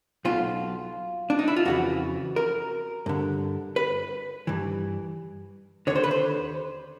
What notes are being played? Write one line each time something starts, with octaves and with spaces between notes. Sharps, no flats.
B1 B2 F4
D4
D#4
E4
F4
F2 C#3 E3 F#4
A#4
G2 D3
B4
G2 E3
D#2 D3 C#5
C5
B4
C5